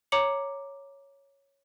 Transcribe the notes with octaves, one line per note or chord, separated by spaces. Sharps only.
C#5 A#5 D6 C#7 F#7